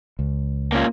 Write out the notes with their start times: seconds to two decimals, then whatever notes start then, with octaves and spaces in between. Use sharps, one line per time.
0.19 C#2
0.72 A#3 C#4 F4